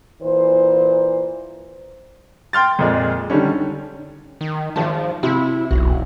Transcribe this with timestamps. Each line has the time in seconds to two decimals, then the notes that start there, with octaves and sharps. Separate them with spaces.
0.22 A#2 E3 C5
2.53 G5 C6 F6 A6
2.79 F2 A#2 G#3
3.30 D3 D#3 G3 C#4
4.41 D#3
4.76 G#1 F3 A5
5.23 C3 E4
5.71 E1 B1 F#4